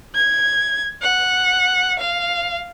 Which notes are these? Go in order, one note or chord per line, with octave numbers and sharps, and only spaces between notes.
G#6
F#5
F5